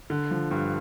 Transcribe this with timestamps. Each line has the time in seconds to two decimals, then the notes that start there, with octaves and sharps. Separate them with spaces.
0.10 D3
0.31 F3
0.51 G2